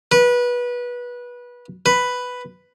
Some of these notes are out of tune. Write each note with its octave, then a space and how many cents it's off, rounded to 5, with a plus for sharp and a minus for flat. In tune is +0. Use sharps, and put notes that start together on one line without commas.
B4 -20
B4 +5